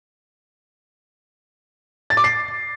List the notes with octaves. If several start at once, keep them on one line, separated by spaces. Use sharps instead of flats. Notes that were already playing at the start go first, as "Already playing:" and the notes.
A6
D6
C7